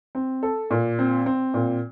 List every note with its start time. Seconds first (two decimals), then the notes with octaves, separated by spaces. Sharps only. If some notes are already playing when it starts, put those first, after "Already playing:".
0.15 C4
0.43 A4
0.71 A#2
0.99 C4
1.26 C4
1.54 A#2